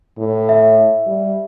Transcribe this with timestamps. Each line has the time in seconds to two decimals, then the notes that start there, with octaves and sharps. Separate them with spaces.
0.18 A2
0.49 E5
1.07 G3